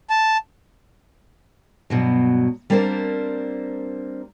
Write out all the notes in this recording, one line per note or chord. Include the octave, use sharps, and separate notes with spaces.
A5
G2 B2 F#3
G3 A#3 C4 D4 A#4 C5